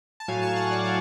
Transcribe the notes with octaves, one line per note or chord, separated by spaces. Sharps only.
A5
A2 F#3 F5 G#5
A5 C#6
F#5 A5
D5 F#5
F5